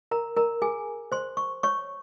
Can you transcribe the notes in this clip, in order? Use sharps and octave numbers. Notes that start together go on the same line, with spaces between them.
A#4 A#5
A#4 A#5
G#4 G#5
C5 C6
C#6
C#5 C#6